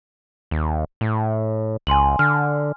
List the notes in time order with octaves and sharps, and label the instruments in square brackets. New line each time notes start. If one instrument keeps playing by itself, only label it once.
[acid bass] D#2
A2
[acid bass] C#2 [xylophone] G#5 C6 F#7
[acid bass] D3 [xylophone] F6